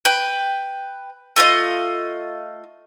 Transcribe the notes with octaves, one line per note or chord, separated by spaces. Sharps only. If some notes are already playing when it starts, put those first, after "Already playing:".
B4 G5
A3 F4 A4 D#5